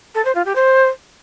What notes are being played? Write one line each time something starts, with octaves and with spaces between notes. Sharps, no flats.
A4
C5
F4
G4
C5